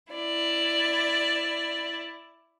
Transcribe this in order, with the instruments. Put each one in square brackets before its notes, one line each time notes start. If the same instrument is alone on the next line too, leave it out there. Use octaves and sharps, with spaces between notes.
[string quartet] E4 D5